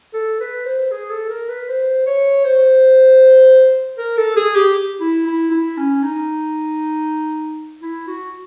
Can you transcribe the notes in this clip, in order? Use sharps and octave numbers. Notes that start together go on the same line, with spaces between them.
A4
B4
C5
G#4
A4
A#4
B4
C5
C#5
C5
A#4
A4
G#4
G4
E4
E4
E4
C#4
D#4
E4
F#4